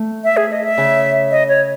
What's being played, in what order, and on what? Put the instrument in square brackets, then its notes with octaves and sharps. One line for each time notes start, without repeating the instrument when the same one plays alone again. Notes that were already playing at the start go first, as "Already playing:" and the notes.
Already playing: [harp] A3
[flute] E5
G#4
D#5
E5
[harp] C#3
[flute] D#5
C#5